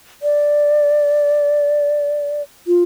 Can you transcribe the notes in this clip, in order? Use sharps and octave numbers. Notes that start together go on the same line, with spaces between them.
D5
F4